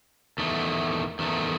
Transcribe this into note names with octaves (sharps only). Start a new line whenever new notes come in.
E2 D#3 A3
E2 D#3 A3